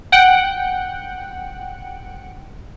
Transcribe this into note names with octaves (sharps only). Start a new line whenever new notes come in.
F#5 G5 F#6